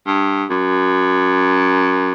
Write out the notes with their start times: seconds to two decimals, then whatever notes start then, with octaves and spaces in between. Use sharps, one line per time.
0.07 G2
0.50 F#2